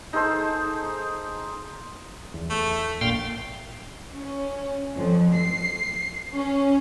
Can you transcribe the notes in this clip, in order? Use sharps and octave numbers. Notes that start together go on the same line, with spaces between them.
D#4 G#4 A4 C5
E2
A3
A#1 A#2 F5 G5 C6
C#4
F2
C7
C#4